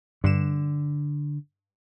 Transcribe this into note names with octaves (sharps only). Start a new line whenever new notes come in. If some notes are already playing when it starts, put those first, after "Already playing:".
G2 D3 E7